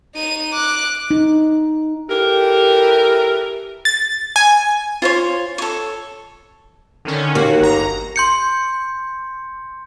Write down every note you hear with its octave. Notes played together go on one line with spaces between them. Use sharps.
D#4 D#7
D6 F#6
D#4
E3 G4 A4 A#4
A6
G#5
F4 C5 C#5
A4 C#5
D3 D#3 C#4
D#2 A#3 F#4
G1 A#5
C6 G6 C#7